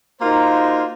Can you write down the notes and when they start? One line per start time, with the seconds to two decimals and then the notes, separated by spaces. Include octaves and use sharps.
0.21 A#3 D#4 F4 F#4 A#4 C5